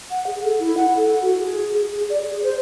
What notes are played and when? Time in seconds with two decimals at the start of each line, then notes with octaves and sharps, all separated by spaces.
0.11 F#5
0.27 G#4
0.44 A4
0.60 E4
0.77 F#5
0.97 A4
1.22 F#4
1.39 G#4
1.78 G#4
2.10 D5
2.22 G#4
2.43 C5